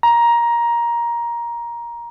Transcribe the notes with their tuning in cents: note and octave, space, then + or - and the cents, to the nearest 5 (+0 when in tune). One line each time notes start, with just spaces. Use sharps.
A#5 +15